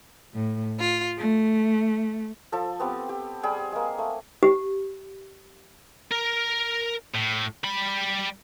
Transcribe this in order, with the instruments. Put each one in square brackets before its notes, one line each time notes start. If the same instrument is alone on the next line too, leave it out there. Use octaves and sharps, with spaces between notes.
[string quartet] A2
F4
A3
[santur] F3 A4
B3 C4 G4
G4
G3 G#4 G5
G#3 A#3
A3
[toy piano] G4
[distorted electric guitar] A#4
A2
G3 B5